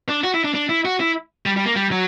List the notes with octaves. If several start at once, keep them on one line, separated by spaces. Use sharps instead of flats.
D4
F#4
E4
D4
D4
E4
F#4
E4
G3
G3
A#3
G3
F#3